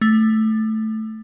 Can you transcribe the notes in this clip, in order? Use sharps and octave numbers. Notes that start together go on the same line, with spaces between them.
A3